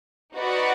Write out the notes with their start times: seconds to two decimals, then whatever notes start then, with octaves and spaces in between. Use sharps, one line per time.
0.37 D#4 F#4 B4 D5 F#5